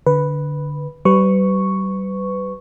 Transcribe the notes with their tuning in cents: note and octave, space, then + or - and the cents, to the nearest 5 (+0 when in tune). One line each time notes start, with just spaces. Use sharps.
D3 +0 B4 +0
G3 -35 B4 +25 C#6 +0